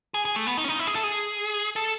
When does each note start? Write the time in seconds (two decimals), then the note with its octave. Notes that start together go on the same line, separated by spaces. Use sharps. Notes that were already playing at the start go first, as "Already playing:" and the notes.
0.14 G#4
0.25 G#4
0.36 A3
0.47 B3
0.58 D#4
0.64 C#4
0.68 D#4
0.79 E4
0.87 G#4
0.95 A4
1.03 G#4
1.76 A4